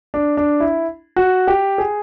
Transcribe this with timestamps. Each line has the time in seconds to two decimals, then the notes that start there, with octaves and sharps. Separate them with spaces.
0.14 D4
0.37 D4
0.60 E4
1.16 F#4
1.48 G4
1.78 G#4